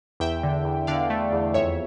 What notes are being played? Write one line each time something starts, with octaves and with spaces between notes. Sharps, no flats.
E2 E5 G5
D3
E2
D3 D5 F5
A3
E2
F2 C#5 E5